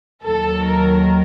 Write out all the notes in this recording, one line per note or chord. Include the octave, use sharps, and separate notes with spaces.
D#2 D#3 F#3 A4
A#4